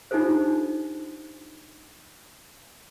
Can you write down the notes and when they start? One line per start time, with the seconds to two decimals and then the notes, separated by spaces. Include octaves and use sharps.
0.11 D4 D#4 F4 G4 A4 C5